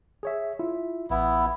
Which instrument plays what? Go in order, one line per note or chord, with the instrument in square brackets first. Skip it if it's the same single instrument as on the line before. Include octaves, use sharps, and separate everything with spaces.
[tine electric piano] G#4 C#5 E5
E4 F4 E5
[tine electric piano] A1 [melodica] B3 E4